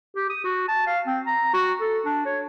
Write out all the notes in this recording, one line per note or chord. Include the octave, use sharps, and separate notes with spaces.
G4
D#6
F#4
A5
F5
C4
A#5
F#4
A4
D4
C#5